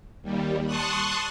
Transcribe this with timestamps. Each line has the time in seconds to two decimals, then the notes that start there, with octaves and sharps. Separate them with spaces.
0.22 D#2 G3
0.65 A5 C6 C#6 D#6 F#6